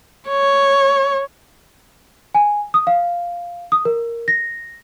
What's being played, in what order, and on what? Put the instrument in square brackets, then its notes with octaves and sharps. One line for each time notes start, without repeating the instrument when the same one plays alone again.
[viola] C#5
[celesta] G#5
D#6
F5
D#6
A#4
A#6